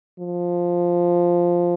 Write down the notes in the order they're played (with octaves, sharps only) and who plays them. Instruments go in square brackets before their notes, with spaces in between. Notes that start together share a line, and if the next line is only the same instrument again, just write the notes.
[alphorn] F3